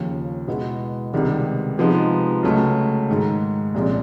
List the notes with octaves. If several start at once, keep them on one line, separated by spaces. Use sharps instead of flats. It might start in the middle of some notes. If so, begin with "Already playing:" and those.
Already playing: D#2 C#3 F3
B2 G#3 B3 E4
C#2 C3 D#3 G3 B3
C3 F3 G#3 B3 D#4
C#2 C#3 F#3 A3
G#2 D#3 G#3
C2 A#2 F3 G#3 C#4